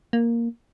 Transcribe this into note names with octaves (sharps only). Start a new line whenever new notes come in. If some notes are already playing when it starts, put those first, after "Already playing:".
A#3